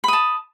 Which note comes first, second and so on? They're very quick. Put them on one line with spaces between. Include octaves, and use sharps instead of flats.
B5 D#6 A5